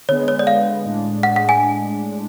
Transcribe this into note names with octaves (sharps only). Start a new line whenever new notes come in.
D3 G#3 B3 C#5
C#5
D5
F5
A2 G#3 D4
F#5
F#5
G#5